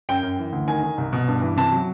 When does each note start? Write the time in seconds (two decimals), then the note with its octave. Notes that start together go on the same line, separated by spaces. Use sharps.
0.09 F#2 G5
0.23 F#2
0.39 E3
0.52 D2
0.67 D#3 G#5
0.83 D#3
0.98 C2
1.13 B2
1.28 G2
1.42 E3
1.56 C3 A5
1.72 F#3